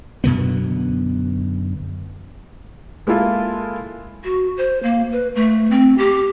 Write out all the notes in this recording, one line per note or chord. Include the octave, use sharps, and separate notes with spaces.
F#2 B2 D3 B3
G#3 A#3 E4 F4 A4
F#4
C5
A#3
B4
A3
C4
G4